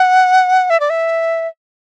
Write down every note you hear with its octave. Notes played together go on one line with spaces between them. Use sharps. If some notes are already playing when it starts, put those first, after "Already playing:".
Already playing: F#5
E5
D5
E5